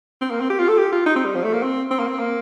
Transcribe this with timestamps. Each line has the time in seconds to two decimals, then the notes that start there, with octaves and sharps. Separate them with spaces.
0.21 C4
0.30 A#3
0.40 C4
0.50 G4
0.59 F4
0.68 A4
0.78 G4
0.92 F4
1.06 D#4
1.16 C4
1.25 G3
1.35 F3
1.44 A3
1.53 A#3
1.63 C4
1.91 C4
1.99 A#3
2.07 C4
2.19 A#3